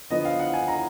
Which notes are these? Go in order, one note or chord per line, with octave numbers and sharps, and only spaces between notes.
D3 F3 B3 D#5
F5
F#5
G#5
A#5